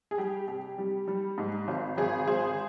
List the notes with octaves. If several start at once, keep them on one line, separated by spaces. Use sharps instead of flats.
G#4
G3 G4
C3 G4
G3
G3
G#2
G#1
G#1 G#4
G#1 G#4 C5